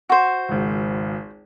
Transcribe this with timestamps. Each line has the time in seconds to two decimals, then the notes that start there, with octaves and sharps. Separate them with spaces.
0.09 F#4 C5
0.48 G#1 C#2